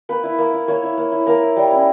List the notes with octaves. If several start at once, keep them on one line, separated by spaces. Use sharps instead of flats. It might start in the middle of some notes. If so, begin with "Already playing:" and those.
A#3 B4
E4
A#3
E4
A#3 C#5
E4
A#3
E4
A#3 A#4
E4
G3
C#4 E4